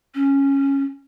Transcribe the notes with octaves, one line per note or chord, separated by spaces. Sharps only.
C#4